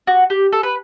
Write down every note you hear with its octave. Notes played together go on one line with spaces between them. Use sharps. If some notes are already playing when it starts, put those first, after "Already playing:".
F#4
G4
A4
B4